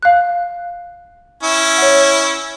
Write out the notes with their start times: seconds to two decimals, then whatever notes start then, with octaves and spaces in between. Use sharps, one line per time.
0.03 F5 F#6
1.43 C#4 E4
1.78 C#5 F#5